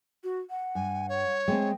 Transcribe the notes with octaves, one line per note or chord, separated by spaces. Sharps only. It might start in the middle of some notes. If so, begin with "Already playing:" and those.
F#4
F#5
G2 G#5
C#5
G#3 A3 C4 G5